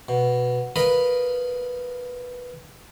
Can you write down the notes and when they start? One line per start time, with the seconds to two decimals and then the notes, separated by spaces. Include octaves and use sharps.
0.09 B2
0.76 A#4 B4 D#5 F5 B5